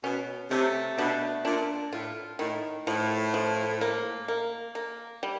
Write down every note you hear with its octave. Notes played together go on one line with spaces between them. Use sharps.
B2 C#4
C3 A3
B2 D4
A#2 D4
A2 F4
A2 D#3
A2 F3
F3
A#3
A#3
A#3
G3